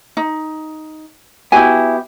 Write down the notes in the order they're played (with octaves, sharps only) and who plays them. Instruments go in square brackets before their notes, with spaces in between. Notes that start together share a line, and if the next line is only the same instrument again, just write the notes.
[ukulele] D#4
[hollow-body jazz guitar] B3 F#4 G4 [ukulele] E4 G#5